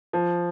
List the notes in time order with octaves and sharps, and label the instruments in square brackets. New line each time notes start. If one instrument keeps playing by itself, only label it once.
[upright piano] F3